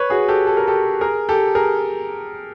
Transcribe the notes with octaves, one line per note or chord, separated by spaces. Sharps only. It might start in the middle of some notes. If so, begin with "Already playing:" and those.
Already playing: B4 C#5
F#4 G#4
G4 A4
A4
A#4
G4 A4
G#4 A#4
G4 A4
G#4 A#4